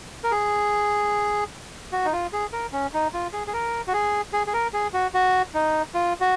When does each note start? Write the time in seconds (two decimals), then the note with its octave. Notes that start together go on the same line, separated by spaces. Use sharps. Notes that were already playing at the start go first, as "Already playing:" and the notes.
0.24 A#4
0.32 G#4
1.92 F#4
2.05 D#4
2.13 F4
2.33 G#4
2.53 A#4
2.73 C#4
2.94 D#4
3.14 F4
3.33 G#4
3.47 G#4
3.53 A#4
3.88 F#4
3.93 G#4
4.33 G#4
4.47 G#4
4.53 A#4
4.73 G#4
4.94 F#4
5.14 F#4
5.54 D#4
5.95 F4
6.21 F#4